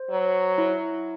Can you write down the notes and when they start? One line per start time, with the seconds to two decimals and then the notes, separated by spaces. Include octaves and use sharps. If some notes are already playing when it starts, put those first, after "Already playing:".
Already playing: C5
0.10 F#3
0.58 E4